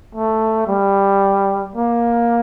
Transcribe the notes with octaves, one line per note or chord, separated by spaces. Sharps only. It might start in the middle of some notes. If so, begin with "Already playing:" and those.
A3
G3
A#3